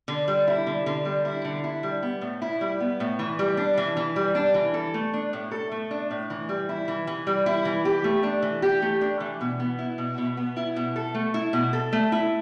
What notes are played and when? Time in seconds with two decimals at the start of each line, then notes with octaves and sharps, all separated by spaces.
0.08 D3
0.28 G3
0.47 E4
0.67 D3
0.86 D3
1.05 G3
1.25 E4
1.45 D3
1.64 E4
1.83 G3
2.03 B3
2.21 A2
2.42 E4
2.61 G3
2.80 B3
3.00 A2
3.19 E3
3.39 G3
3.57 D4
3.78 E3
3.97 E3
4.16 G3
4.35 D4
4.54 E3
4.74 A4
4.94 A3
5.14 D4
5.33 A2
5.51 A4
5.72 A3
5.91 D4
6.11 A2
6.30 E3
6.49 G3
6.69 E4
6.88 E3
7.07 E3
7.27 G3
7.46 E4
7.65 E3
7.85 G4
8.04 A3
8.23 D4
8.42 E3
8.62 G4
8.82 A3
9.01 D4
9.20 E3
9.41 B2
9.60 B3
9.79 E4
9.98 B2
10.18 B2
10.37 B3
10.57 E4
10.76 B2
10.96 A4
11.15 A3
11.34 E4
11.53 B2
11.73 A4
11.93 A3
12.12 E4